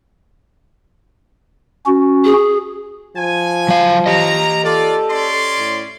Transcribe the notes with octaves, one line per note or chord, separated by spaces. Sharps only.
C#4 F#4
G#4
F3 G#5
F#3 F5
G4 D#5 A#5
F4 A4 D5
C#4 D5 C6
A2